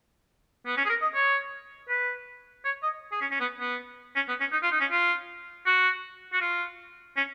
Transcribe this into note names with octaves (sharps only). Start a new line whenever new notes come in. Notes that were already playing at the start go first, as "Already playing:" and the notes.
B3
C#4
G#4
A#4
D#5
C#5
B4
C#5
D#5
G#4
C#4
C#4
B3
B3
C#4
B3
C#4
D#4
F4
D#4
C#4
F4
F#4
F#4
F4
C#4